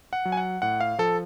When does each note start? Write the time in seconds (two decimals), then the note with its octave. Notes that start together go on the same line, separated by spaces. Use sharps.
0.13 F#5
0.25 F#3
0.32 G#5
0.37 F#5
0.62 A2 F#5
0.80 F5
0.98 F3 A4